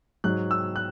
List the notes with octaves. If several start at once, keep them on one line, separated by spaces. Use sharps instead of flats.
G#2 F#3 F#6
E6
F#6